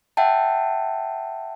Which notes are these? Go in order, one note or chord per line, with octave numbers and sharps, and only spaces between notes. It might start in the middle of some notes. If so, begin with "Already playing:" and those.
E5 F#5 G5 A5